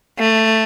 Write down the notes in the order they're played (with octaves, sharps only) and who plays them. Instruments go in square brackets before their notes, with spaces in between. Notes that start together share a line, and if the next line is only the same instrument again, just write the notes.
[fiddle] A3